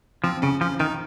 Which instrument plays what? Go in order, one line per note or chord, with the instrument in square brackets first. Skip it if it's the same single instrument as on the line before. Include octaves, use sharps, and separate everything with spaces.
[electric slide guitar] F3 [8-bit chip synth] C4
[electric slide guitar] C#3 [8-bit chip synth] C#4
[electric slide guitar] F3 [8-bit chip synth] C#4
[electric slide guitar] D#3 [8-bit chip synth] D#4